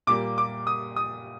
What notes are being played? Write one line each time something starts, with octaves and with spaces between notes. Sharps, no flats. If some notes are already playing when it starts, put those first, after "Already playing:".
A#2 G3 A#3 D6
D6
D#6
D#6